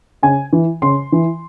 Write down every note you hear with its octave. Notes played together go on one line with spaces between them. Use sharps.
C#3 G#5
E3
C#3 C6
E3